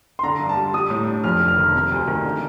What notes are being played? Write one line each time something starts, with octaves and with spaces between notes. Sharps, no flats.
C6
D3 A#5
G2
A5
G3
G3 D#6
A2
D4
F2 F6
F1
F6
D#3
C3
D2
D#3
D3